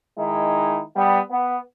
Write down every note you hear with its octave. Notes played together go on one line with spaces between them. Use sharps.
D#3 G#3 D#4 E4
G3 B3
B3